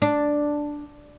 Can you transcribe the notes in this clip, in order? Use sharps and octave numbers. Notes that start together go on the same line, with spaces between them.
D4